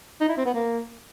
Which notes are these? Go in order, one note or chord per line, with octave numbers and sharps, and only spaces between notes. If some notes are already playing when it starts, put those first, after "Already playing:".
D#4
E4
C4
B3
A#3